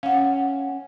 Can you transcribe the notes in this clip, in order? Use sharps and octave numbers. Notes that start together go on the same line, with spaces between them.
C#4 F5 F#5